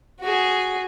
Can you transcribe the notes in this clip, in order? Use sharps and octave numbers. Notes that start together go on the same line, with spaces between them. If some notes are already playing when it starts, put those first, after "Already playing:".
F#4 G#4